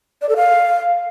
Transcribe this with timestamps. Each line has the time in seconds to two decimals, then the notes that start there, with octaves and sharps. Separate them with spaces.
0.22 D5
0.29 A4
0.36 F5